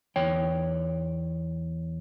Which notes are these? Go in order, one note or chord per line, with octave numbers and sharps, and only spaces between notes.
E2 C#5 G5